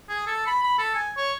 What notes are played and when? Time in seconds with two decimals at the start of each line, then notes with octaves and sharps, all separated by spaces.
0.09 G#4
0.27 A4
0.47 B5
0.63 B5
0.78 A4
0.95 G#5
1.17 C#5